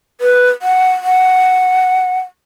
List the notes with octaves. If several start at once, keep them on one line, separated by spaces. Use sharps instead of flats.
B4
F#5
F#5